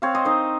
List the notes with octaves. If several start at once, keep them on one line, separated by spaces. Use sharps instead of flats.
C4 C#5 F5
C5 D#5
D#4 C5 D#5